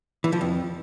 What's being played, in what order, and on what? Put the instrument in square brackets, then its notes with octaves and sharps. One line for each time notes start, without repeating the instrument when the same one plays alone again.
[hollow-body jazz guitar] E3
F3
F2